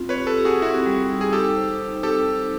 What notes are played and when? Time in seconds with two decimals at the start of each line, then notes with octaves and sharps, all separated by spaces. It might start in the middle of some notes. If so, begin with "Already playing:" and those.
Already playing: C4 F4
0.09 B4 C#5
0.16 G4
0.27 A4 B4
0.38 G4
0.45 F#4 G#4
0.62 C4 E4 F#4
0.86 G3
1.09 D#4
1.21 G#4
1.32 D#4 G4 A4
1.56 C5
1.79 D#4
2.03 C4 G4 A4